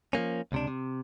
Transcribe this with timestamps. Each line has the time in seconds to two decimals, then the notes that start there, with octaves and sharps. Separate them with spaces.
0.13 F3 F#3 A#3 C#4
0.52 C#2 C3 D4
0.67 C3